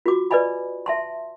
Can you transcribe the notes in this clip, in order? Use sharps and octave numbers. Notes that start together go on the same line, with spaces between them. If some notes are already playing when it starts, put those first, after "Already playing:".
F4 F#4 D6
B4 D5 D#5 G#5 B5
E5 A5 C6